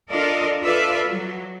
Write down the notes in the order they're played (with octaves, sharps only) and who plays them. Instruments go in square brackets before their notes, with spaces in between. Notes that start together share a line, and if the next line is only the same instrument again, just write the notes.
[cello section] D4 F4 A4 A#4 D5 D#5
F4 A4 B4 D5 E5 F5
F#3